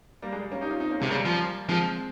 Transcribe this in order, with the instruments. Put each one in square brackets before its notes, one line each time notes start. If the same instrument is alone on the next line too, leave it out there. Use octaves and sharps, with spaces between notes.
[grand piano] G3 A#3
G#3
G3
A#3 C#4
D#4 G4
C#4 F4
C4 D#4
A#3 C#4
[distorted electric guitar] C3 [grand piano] G#3 C4
[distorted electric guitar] C#3 [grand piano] G3 A#3
[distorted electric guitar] F3
[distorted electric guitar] F3 [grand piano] G#3 C4